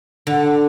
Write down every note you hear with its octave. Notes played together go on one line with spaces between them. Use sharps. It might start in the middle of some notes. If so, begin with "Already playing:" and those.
D3